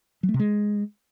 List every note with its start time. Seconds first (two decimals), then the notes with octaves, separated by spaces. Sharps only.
0.23 F#3
0.29 A3
0.34 C3
0.39 G#3